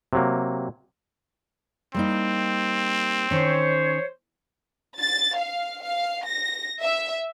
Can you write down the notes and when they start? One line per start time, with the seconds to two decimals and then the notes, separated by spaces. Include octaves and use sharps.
0.13 C3 F#3 A#3
1.94 G3 A#3 C4 D#4
3.31 D#3 C#4 C5 C#5
5.00 A6
5.37 F5
5.83 F5
6.25 A#6
6.82 E5